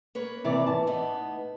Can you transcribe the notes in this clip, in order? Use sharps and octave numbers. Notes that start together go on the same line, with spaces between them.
A#3 B4 C#5
C3 E3 D5
A5
A2 B3 D#4